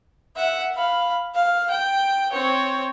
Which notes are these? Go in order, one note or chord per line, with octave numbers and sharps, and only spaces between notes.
E5 F#5
F5 B5
F5
G5
C4 C#5